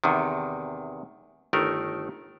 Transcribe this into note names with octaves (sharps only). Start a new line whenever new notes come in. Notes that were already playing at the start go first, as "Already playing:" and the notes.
E2 C3 D#3
G1 D#3 A3 A#4